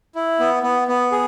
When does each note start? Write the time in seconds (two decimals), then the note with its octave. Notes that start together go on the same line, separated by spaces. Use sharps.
0.15 E4
0.40 B3
0.63 B3
0.88 B3
1.12 G#4